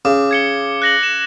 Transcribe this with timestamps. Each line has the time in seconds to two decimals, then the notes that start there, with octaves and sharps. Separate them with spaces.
0.05 C#3 D6
0.31 G#6 C#7 G7
0.82 F#6 A#6 F#7
1.03 E7